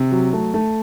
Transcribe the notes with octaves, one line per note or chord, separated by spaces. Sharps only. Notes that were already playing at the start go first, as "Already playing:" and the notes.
Already playing: C3
F#3
A3
A3